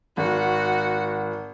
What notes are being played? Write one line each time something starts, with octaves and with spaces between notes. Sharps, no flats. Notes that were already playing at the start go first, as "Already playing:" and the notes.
G#1 F#4